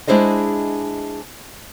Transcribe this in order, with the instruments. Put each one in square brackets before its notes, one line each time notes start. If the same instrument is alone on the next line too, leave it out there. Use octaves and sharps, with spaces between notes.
[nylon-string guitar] G#3 D4 E4 G#4 C5 D#5